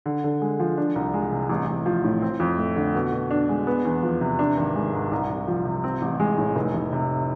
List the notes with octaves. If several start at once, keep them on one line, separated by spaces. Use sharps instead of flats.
D3
D3
G#3
F3
D4
C2
G#3
C3
A1
A1
F3
A2
C4
F2
A3
D3
B2
B2
D4
G#3
B3
E2
F3
C3
D4
G#1
G#3
G#2
C2
C2
F3
C3
C4
A1
G#3
A2
F1
F1
C3